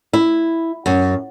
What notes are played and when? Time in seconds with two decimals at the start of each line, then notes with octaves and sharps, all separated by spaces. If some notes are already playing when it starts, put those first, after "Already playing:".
0.13 E4
0.86 F#2